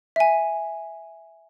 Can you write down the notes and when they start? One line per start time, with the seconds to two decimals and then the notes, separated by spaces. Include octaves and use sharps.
0.16 E5 G#5